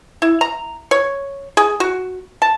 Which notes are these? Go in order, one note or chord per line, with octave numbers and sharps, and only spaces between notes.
E4
A#5
C#5
G#4
F#4
A5